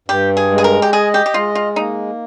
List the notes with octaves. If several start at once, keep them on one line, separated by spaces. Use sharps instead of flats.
G2 G4
G#4
G#3
G#4
A#4
G4
G#4 D#5
G4
G4
G#3 F4
F4
A#3 D#4